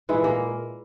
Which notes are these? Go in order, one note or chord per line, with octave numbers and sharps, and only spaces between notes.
A#2 E3 G#3 E4
A#3 A#4